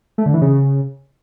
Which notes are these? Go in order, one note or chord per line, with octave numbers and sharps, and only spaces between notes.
A3
D3
E3
C#3